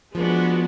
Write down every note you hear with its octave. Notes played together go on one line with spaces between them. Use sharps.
F3 G#3 B3 D4 F#4